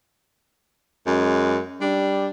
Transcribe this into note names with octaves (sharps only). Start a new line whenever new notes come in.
F#2 G#3
G3 D4